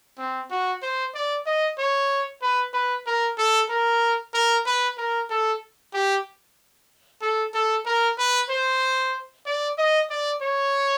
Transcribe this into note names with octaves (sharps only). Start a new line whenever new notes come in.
C4
F#4
C5
D5
D#5
C#5
B4
B4
A#4
A4
A#4
A#4
B4
A#4
A4
G4
A4
A4
A#4
B4
C5
D5
D#5
D5
C#5